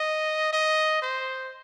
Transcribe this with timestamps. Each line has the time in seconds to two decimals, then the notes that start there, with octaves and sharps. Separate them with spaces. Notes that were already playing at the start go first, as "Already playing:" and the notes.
Already playing: D#5
0.53 D#5
1.02 C5